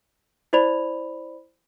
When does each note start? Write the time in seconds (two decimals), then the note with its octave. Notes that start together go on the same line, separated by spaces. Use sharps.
0.53 E4 C5 D5 B5 F7